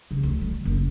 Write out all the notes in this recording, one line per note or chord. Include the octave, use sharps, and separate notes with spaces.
C#3
D2
G3
F#1